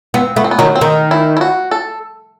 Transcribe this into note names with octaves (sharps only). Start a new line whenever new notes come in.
B3 C4
A3 B3
C4
B3
D#3 F#3
C4
D#3 D#4
E4
E4
F#4
A4